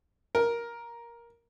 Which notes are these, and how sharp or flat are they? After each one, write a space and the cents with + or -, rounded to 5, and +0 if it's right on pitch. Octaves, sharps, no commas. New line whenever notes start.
A#4 +10